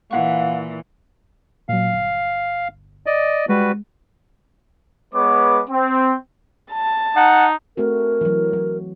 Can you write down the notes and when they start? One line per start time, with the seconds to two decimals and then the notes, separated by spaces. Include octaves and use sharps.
0.11 A#2 E3 F5 F#5 C#6
1.69 A#2 F#3 F5
1.93 G1
3.06 D5 D#5
3.49 G3 G#3 F#4 B4
5.14 G#3 B3 B4 C#5 D6
5.69 C4
6.72 A5
7.16 D#4 F#5
7.77 A3 C4 F#4 A#4
8.21 E3 F#3
8.53 F#3